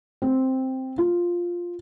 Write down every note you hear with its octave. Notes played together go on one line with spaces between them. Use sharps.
C4
F4